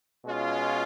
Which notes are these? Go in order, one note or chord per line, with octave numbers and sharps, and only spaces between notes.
B2 G#3 C#4 F4